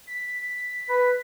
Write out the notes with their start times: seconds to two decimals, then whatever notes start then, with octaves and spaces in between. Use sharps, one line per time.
0.07 B6
0.89 B4